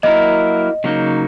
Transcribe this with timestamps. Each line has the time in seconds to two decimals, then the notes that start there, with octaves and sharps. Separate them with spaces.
0.03 F#3 A#3 E4 A#4 D#5
0.84 C#3 F#3 A#3 D#4